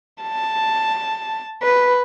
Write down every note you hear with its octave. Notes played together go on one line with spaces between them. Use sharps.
A5
B4